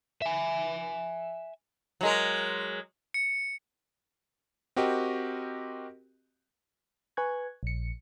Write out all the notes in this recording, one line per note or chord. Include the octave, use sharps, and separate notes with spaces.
E5 G#5
F#3 G#3 A#4
C#7
C4 F#4 G4 A#4 D#5
B4 G#5 C#6 F#6 G#6
A#1 C#7